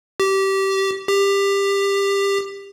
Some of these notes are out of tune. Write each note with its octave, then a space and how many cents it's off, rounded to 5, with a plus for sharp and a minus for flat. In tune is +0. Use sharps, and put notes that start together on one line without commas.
G4 -20
G4 +20